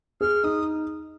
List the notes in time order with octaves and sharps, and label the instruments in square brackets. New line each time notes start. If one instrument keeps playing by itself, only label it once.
[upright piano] G#4 [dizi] F6
[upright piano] D#4 [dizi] D#6